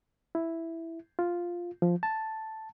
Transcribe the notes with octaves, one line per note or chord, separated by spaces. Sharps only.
E4
F4
F3
A5